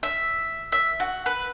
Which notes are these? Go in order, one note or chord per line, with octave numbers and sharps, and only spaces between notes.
E5
E5
F#4
B4